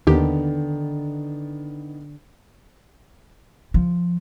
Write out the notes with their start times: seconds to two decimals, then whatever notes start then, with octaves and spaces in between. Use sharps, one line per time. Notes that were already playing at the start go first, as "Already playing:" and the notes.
0.07 D#2 D3 D#3 B3 D4 G4
3.74 F3